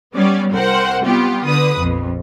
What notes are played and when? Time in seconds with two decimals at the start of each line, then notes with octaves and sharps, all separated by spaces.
0.14 G3 B3 C#4 D5
0.53 C2 A#4 C5 F#5 G5
1.04 G3 B3 F4 G4
1.45 D3 B4 D#6
1.78 A#1 F2